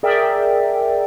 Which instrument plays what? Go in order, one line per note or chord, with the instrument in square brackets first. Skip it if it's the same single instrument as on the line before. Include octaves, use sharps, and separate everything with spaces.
[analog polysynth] G#4 A#4 D5 E5 G5